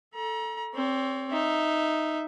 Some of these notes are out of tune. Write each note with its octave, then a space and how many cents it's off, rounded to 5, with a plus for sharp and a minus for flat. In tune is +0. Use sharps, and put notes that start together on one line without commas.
A4 +0 A#5 +35
C4 +15 C#5 +40
D#4 +0 E5 +0